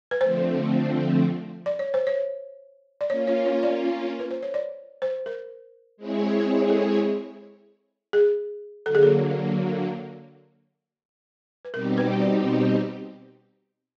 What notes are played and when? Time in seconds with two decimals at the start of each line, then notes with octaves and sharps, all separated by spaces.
0.11 B4
0.21 D3 F3 A3 C4 C5
1.66 D5
1.79 C#5
1.94 C5
2.07 C#5
3.01 D5
3.10 A#3 C#4 F4 C#5
3.27 C#5
3.46 C#5
3.63 D5
4.19 B4
4.31 C5
4.42 C#5
4.54 D5
5.02 C5
5.26 A#4
5.97 G#3 C4 E4 G#4 C#5
6.70 A4
8.13 G#4
8.85 D3 F#3 A#3 A4
8.95 G#4
9.03 A4
11.65 B4
11.73 B2 G3 C4 D#4 G4 A#4
11.98 B4
12.21 D5